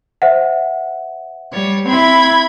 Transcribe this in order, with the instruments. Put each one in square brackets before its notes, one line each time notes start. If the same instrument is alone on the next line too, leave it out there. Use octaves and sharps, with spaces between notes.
[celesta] C5 E5 F#5
[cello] G3 [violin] C#5
[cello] C4 E4 [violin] B5 G#6